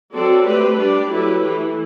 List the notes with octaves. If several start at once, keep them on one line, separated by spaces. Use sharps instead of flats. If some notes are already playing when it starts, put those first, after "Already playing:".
F#3 C4 F#4 A4 D5
A3 C4 G4 B4
G3 D4 G4 D5
F#3 A3 E4 G4 B4
E3 A3 E4